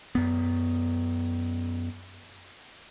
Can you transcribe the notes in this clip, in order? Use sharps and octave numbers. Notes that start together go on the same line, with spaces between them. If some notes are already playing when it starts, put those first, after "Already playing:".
F#2 B3